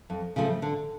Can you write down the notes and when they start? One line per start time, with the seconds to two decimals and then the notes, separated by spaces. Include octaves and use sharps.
0.10 F2
0.36 C#3 F3 A3
0.62 D3